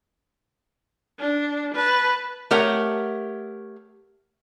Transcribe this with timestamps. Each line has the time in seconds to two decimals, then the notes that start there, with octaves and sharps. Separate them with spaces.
1.19 D4
1.74 B4 A5
2.51 A3 G4 A#4 C#5 F#5